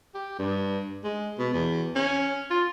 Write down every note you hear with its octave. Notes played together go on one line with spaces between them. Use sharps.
G4
G2
G#3
B2
E2
C#4
F4